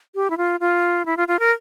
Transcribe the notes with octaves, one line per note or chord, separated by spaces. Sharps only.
G4
E4
F4
F4
E4
F4
F4
A#4